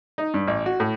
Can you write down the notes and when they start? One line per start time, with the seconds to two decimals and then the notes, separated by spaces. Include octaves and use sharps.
0.18 D#4
0.34 G2
0.47 A1
0.66 F#4
0.80 A2